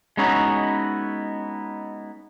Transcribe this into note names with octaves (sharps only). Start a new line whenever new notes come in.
G#3 B3 C#4 D#4 E4 F#4